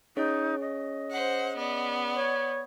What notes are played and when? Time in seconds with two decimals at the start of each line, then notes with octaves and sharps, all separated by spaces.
0.17 C#4 D#4 G#4 C#5
0.61 D#5
1.11 C5 F#5
1.57 B3 D5
2.16 C#5